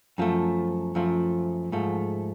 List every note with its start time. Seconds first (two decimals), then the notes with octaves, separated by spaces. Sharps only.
0.18 F#2 F3 A3
0.95 F#2 F3 A3
1.72 G#2 F3 A3